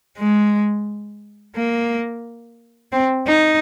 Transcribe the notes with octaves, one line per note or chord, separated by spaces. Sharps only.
G#3
A#3
C4
D#4